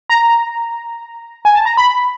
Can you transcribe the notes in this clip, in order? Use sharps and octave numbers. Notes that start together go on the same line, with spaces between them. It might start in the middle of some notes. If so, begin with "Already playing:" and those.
A#5
G#5
A5
A#5
B5